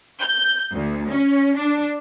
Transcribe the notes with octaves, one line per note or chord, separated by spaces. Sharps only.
G6
D2
C#4
D4